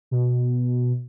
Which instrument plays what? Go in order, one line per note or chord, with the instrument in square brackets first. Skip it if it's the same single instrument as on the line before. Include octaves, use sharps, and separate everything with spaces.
[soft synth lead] B2